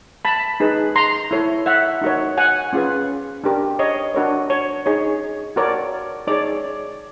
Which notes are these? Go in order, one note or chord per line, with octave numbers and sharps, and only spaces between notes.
A5 B5
D#4 G#4 B4
A#5 C6
E4 A4 C#5
E5 F#5
D#4 F#4 A#4 C#5
F#5 G#5
C#4 F4 G#4 B4
D4 G4 A#4
C#5 D#5
D4 F#4 A#4 C#5
C#5
D#4 G#4 C#5
F#4 A#4 C#5 D5
D#4 G#4 C#5 D5